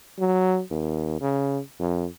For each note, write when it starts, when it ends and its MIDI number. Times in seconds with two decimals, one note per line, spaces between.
0.19 0.61 54
0.71 1.20 39
1.21 1.59 49
1.80 2.06 41